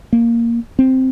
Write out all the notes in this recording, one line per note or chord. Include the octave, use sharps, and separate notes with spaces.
A#3
C4